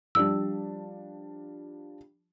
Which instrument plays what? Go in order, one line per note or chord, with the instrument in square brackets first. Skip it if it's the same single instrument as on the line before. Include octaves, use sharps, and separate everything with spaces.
[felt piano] F3 G3 D4 [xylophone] E6